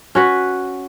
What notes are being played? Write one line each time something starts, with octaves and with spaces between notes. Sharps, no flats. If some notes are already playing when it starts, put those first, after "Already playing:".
C#4 F#4 B4